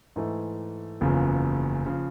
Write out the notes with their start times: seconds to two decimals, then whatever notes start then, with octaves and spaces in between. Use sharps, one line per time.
0.16 G#2 E3 A3
1.01 F#1 E2 C#3 F3
1.86 C#3 F3